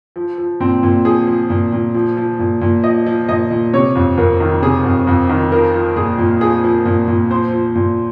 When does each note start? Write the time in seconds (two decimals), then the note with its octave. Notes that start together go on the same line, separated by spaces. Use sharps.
0.16 F3
0.38 F3
0.60 A#2 C4
0.83 A#2
1.05 F3 G#4
1.27 F3
1.50 A#2
1.72 A#2
1.95 F3
2.17 F3
2.39 A#2
2.61 A#2
2.84 F3 D#5
3.06 F3
3.29 A#2 D#5
3.51 A#2
3.73 C3 C#5
3.95 F2
4.17 F2 A#4
4.40 D#3
4.62 C3 G#4
4.85 F2
5.07 F2
5.29 D#3
5.52 F3 A#4
5.74 F3
5.96 A#2 G#4
6.18 A#2
6.41 F3 G#4
6.64 F3
6.85 A#2
7.08 A#2
7.30 F3 C5
7.53 F3
7.76 A#2